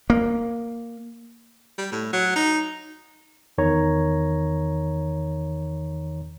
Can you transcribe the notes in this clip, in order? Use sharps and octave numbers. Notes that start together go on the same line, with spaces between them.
A#3
G3
A2
F#3
D#4
E2 D#3 C#5 A#5